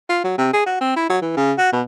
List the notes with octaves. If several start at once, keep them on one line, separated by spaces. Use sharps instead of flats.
F4
F#3
C3
G#4
F#4
C4
E4
F#3
E3
C#3
F#4
B2